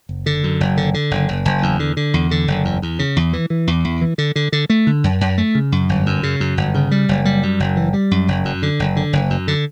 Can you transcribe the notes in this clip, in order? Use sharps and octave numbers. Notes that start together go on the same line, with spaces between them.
F#1
D3
F#2
F#1
D3
D3
F#1
F#1
F#1
E2
D3
D3
E2
D3
F#1
E2
E2
C#3
E2
E3
E3
E2
E2
E3
D3
D3
D3
A3
D3
F#2
F#2
A3
C#3
F#2
G1
F#2
C#3
F#2
G1
C#3
G3
F#1
G3
F#2
F#1
E3
G3
F#2
F#1
F#2
D3
F#1
D3
F#1
F#2
D3